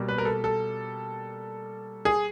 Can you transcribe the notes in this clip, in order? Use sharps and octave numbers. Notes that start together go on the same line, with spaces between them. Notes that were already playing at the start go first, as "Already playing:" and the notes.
Already playing: B2 G3 A#3
B4
A#4
A4
A4
G#4